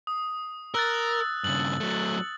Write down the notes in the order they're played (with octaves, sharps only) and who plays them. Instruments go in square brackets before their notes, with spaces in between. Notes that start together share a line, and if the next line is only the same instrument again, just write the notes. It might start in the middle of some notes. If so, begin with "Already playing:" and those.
[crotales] D#6
[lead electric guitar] A#4 [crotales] E6 F#6 A6
[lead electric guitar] G2 C#3 [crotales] F#7
[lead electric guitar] F#3 A3